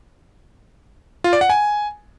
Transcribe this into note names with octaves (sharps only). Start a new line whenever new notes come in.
F4
D5
F#5
G#5